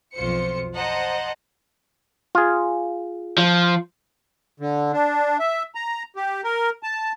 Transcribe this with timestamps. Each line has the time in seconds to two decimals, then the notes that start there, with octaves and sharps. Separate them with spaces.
0.15 B1 F2 F4 C5 C#7
0.74 C5 D#5 F#5 A5 A#5
2.35 F4 G#4
3.38 F3
4.60 D3
4.93 D4
5.40 E5
5.75 A#5
6.16 G4
6.44 A#4
6.83 A5